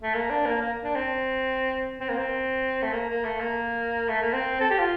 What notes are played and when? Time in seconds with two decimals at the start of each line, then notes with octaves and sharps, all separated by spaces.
0.03 A3
0.15 A#3
0.30 D4
0.46 A#3
0.61 A#3
0.84 D4
0.96 C4
2.00 C4
2.09 A#3
2.18 C4
2.82 A3
2.93 A#3
3.09 A#3
3.24 A3
3.40 A#3
4.09 A3
4.22 A#3
4.33 C4
4.61 A4
4.71 G4
4.79 F4